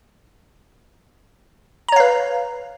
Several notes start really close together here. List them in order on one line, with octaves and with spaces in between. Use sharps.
A#5 C#5 F5 B4